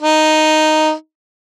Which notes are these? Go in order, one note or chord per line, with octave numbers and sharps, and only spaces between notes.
D#4